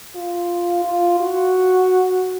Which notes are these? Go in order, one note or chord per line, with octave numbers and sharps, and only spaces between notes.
F4
F4
F#4